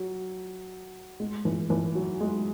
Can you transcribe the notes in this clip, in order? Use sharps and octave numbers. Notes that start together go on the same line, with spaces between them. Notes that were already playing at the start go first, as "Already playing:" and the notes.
Already playing: F#3
G#3
E3
E3
F#3
G#3